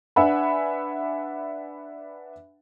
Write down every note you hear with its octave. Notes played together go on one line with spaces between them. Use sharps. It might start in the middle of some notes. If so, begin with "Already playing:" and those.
D4 B4 E5 F#5 G#5 B5